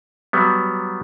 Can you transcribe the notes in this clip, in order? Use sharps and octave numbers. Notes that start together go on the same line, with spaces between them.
F#3 G3 B3